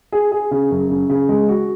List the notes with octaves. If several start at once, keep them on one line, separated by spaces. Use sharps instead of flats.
G#4
G#4
C#3
F#2
C#3
C#3
G#3
F#4